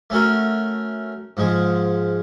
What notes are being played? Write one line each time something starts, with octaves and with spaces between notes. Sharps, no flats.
A3 C#4 F#4 A#4
G#2 F3 G#3